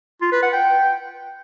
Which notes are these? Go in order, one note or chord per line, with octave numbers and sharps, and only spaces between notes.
F4
B4
F#5
G5